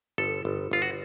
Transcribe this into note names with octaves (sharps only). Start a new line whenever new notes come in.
G1 A4
G1
G1 F4
F#4